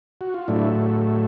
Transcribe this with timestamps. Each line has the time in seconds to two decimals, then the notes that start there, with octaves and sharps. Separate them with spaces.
0.21 F#4
0.34 F4
0.48 A2 F#3 A3 D4 E4